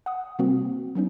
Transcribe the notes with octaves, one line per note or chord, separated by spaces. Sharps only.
F#5 D#6
C3 G3 A#3 C4 F#4
F#3 B3 C#4 D#4